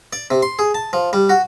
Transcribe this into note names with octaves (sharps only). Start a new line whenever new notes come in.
D5
C3
C6
G#4
A5
F3
G3
F#4